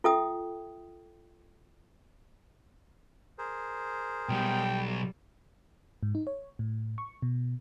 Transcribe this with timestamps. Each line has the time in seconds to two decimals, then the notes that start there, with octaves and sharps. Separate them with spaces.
0.04 F4 A4 E5 G5 D#6
3.38 G#4 A#4 C5
4.29 B1 G3 G5
6.03 G#2
6.15 D#4
6.27 C#5
6.59 A2
6.98 C#6
7.22 B2